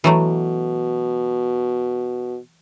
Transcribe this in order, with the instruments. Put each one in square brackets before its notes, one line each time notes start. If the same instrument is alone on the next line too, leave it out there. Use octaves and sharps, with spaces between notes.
[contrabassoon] B2 [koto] E3 F#3 A3